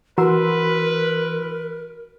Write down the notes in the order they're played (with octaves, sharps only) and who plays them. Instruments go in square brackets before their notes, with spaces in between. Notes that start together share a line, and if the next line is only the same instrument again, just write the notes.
[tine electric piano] E3 C6 E6 [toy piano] F#4 F#5 A#5 [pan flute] A#4 [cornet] B4